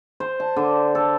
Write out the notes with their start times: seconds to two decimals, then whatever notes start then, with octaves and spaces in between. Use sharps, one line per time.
0.20 C5
0.40 A5
0.56 D3
0.95 A4